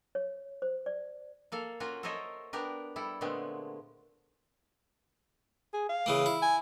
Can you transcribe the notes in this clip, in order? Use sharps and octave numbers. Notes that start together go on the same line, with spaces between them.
C#5
C5
D5
A#3 A4 F5
A#3 C#4 F4 F#4
A4 A#4 C5 C#5 D#5 E5
B3 D4 G4 A#4
G3 E4 A4
A#2 D3 G#3 A3 B3 C4
G#4
F5
C#3 E3 A#3
E4
G#5